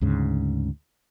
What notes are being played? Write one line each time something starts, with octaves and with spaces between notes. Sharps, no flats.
D2 G#2 C#3